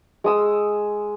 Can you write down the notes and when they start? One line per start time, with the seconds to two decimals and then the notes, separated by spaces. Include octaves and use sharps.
0.24 G#3 D#6 E6